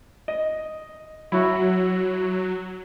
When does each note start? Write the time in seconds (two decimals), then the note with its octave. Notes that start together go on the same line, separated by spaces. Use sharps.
0.28 D#5
1.32 F#3 E4 F#4